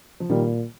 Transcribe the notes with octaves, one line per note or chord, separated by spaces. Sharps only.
F3
A#2 D#3 G3